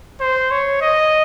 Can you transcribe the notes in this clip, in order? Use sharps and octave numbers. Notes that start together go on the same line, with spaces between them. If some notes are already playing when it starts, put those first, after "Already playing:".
C5
C#5
D#5